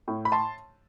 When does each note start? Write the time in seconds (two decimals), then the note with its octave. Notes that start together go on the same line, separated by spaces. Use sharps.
0.08 A2
0.25 B5
0.32 A5 C6